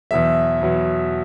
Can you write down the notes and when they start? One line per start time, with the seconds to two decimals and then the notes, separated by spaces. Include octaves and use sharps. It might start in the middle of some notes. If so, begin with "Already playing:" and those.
0.11 E2 B2 F#3 E5
0.61 E2 B2 F#3